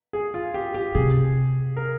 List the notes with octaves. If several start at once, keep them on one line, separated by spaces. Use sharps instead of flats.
G#4
F4
G4
G4
C3 G#4
A#4